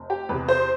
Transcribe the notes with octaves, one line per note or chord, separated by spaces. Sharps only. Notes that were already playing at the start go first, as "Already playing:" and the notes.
Already playing: F1
G4
E2 C3 B4
C5